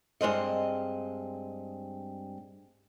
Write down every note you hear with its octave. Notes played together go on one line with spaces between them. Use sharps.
G2 G#3 C4 D#5